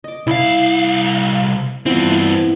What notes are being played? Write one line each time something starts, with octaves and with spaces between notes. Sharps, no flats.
D#5 D6
C2 E4 F5
G2 E3 B3 C4 F4
E4